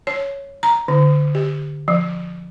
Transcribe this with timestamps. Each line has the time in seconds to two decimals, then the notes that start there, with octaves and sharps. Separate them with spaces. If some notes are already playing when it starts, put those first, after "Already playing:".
0.07 C#5
0.63 A#5
0.88 D3
1.35 G4
1.88 F3